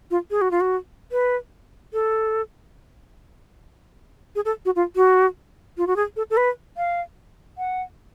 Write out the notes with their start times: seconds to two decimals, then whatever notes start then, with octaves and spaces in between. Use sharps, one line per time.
0.11 F4
0.31 G#4
0.41 F#4
0.51 F4
0.61 F#4
1.12 B4
1.93 A4
4.35 G#4
4.45 A4
4.65 F#4
4.76 F4
4.96 F#4
5.77 F4
5.87 F#4
5.96 G#4
6.16 A4
6.30 A4
6.37 B4
6.77 F5
7.58 F#5